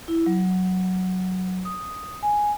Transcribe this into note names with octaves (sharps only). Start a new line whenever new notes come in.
E4
F#3
D#6
G#5